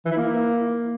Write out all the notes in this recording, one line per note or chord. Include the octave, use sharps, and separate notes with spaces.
E3
E4
A#3